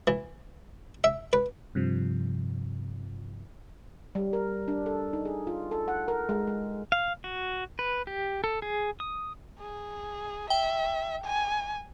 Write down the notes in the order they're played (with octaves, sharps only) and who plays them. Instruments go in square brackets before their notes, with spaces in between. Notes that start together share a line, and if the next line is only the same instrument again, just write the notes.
[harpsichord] E3
E5
B4
[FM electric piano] G2 C3 F3
[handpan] G3
A#4
D4
A4
D#4
G#4
F4
A4
F#5
A#4
G#3
G#3
[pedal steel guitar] F5
F#4
B4
G4
A4
G#4
D#6
[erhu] G#4
[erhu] E5 [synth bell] G5
[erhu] G#5